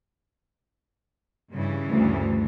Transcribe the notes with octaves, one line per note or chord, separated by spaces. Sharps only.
G2 C#3 E3
D2